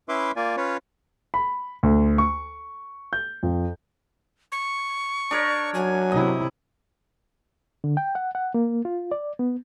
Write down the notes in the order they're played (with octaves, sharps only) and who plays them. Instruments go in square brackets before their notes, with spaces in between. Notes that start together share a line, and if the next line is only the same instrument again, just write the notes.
[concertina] C#4 E4 B4 E5 C6 D6
A#3 F4 D5 G#5
C#4 F4 B4 C#5
[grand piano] B5
D2
C#6
G6
F2
[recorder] C#6
[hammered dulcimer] D4 A#4 C#5
[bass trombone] F#3 [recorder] G#5
[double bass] C3 E4 [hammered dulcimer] D#5
[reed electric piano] D3
G5
F#5
F#5
A#3
F4
D5
B3